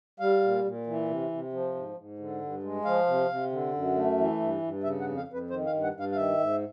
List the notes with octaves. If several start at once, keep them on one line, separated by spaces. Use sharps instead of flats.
G3 F5
A#2
A#2
E3
C3
C3
F3
G#2
G#2
D3
G2
G#3
F3 F5
C3
C3
D3
F#2
A3
E3
G2
G2
C#3 E5
F#5
F2
F5
F2
B4
D#3 C5
F5
G2
F#5
G2
F5
F5
D#3 E5
G#2